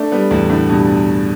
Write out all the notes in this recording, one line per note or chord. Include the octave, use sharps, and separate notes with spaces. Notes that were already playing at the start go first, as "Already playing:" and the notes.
Already playing: A3 D4
G3 B3
E2 A2
A2 D3
G2 B2